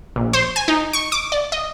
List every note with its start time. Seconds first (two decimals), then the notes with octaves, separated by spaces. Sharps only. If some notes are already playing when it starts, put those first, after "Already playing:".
0.16 A#1
0.33 C5
0.56 G#5
0.68 D#4
0.93 C#6
1.12 D6
1.32 D5
1.52 D#5